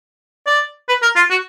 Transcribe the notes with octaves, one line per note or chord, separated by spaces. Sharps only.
D5
B4
A#4
F4
F#4